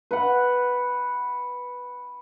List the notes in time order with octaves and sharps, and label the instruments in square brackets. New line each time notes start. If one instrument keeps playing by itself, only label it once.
[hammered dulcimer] B4 F#5